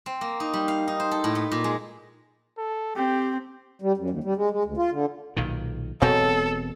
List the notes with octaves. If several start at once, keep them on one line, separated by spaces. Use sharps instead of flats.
C4
A#3
D#4
G3
F5
D#4
C5
A4
A2
B3
A#2
G#3
A4
C4 G4
G3
F#2
D#2
G3
G#3
G#3
D2
F4
D3
B1 A#2 D#3
E1 B2 F#3 C4 C#4 D#4 A4